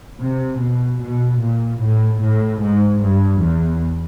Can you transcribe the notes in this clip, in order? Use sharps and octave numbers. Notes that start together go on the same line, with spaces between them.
C3
B2
B2
A#2
A2
A2
G#2
G2
E2